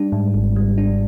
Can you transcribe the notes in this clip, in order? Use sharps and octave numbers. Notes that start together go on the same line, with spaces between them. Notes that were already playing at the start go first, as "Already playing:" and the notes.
Already playing: G3 D4
G#2
G#1
G3
D4